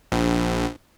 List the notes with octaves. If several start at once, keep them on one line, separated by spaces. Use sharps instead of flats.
A#1